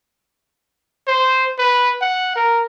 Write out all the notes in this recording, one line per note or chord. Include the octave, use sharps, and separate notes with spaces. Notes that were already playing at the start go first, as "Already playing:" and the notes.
C5
B4
F#5
A#4